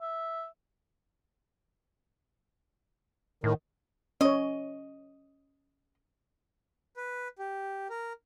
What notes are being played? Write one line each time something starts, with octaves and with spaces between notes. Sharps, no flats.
E5
A2 D#3
C#4 C#5 D#5
B4
G4
A#4